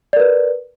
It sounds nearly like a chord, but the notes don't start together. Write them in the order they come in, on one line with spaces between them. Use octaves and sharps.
D5 A#4 B4